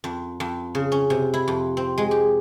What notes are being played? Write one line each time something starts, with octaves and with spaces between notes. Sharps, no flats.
F2
F2
C#3
C#4
C3
E4
F2
C4
G#3
G4